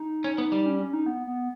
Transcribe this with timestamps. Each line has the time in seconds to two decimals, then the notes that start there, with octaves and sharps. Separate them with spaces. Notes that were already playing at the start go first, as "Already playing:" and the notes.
Already playing: D#4
0.24 C#4
0.38 B3
0.52 G3
0.66 C#4
0.79 C#4
0.93 D#4
1.06 B3
1.27 B3